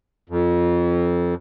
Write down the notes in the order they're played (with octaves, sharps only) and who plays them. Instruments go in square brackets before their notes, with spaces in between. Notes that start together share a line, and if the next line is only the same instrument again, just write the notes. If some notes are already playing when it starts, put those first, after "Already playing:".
[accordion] F2